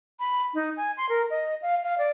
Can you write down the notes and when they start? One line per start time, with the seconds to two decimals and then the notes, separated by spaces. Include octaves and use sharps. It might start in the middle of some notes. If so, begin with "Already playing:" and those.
0.20 B5
0.54 D#4
0.77 G#5
0.97 C6
1.09 A#4
1.30 D#5
1.62 F5
1.84 F5
1.98 D5